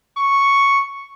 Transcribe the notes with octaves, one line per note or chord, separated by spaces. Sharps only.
C#6